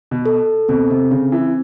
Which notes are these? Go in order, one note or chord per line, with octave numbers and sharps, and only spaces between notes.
B2
A4
B2 C4
C3
C#3 C4
E3